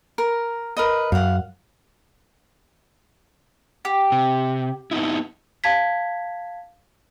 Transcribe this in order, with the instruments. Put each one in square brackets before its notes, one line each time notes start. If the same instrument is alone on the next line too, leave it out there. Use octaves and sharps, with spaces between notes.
[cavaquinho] A#4
A#4 B4 D#5
[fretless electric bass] F#2 [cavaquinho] F5 F#5
[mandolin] G4
[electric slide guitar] C3
B3 D#4 E4
[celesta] F5 A5 G#6 B6